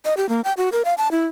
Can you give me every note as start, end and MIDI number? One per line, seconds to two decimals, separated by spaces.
0.05 0.14 75
0.17 0.28 67
0.29 0.41 58
0.44 0.53 79
0.57 0.69 66
0.72 0.82 70
0.85 0.94 77
0.98 1.08 81
1.12 1.25 64